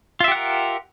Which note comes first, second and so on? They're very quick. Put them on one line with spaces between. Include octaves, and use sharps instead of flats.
F4 E5 G4 F#5 A#4